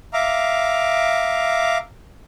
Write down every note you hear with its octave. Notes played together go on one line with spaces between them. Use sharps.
E5 F5 A#5 D6